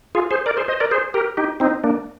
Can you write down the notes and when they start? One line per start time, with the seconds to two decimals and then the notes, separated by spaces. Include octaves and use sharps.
0.15 F4 G#4
0.31 G#4 C5
0.46 A#4 D5
0.57 G#4 C5
0.68 C5 D#5
0.80 A#4 D5
0.91 G#4 C5
1.14 G4 A#4
1.37 D#4 G4
1.60 C4 D#4
1.84 A#3 D4